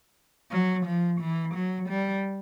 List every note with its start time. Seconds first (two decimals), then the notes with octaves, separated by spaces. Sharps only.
0.51 F#3
0.86 F3
1.20 E3
1.55 F#3
1.89 G3